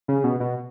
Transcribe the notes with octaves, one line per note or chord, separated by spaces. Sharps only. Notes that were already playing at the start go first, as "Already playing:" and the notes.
C#3
B2
B2